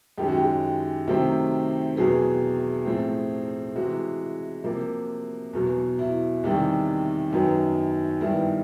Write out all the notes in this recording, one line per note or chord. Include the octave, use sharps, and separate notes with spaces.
F#2 D#3 G#3 C#4 G4
F#4
G4
C3 D#3 F#3 A3 C4
E2 B2 F#3 B3 G#4
A2 F3 A3 C4
C3 E3 G#3 F#4
C3 F3 A#3
E2 B2 F#3 B3
E4
E2 C3 D#3 G3
F#2 D#3 F#3 B3
G2 D#3 G3 B3 E4